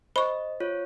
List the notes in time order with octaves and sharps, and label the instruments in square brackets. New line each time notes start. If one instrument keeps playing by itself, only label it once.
[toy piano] C5 [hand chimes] D#5 [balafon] B5 C#6
[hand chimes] F4 C#5